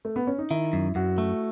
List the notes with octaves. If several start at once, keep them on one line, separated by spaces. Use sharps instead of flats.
A3
B3
C#4
D#4
D#3 E4
F#2
F#2 F#4
A3